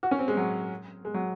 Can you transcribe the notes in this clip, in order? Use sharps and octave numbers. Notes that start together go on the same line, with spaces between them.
F#4
C#4
C4
G#3
F#3
G#3
F#3